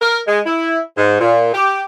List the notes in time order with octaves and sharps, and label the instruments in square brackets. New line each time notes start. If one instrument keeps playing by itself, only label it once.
[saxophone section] A#4
G#3
E4
G#2
A#2
G4